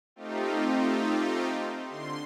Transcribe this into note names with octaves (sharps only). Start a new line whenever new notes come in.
A3 C4 D#4 F4 G4
D3 C6